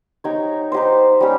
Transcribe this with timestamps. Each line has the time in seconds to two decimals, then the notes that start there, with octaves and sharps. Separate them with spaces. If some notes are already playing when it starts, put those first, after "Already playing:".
0.24 D#4 G4 C#5
0.72 D#4 G4 C5
1.20 G3 C#4 G4